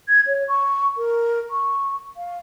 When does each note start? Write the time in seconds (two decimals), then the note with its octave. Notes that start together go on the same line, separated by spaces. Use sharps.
0.09 G#6
0.27 C#5
0.49 C#6
0.97 A#4
1.51 C#6
2.17 F5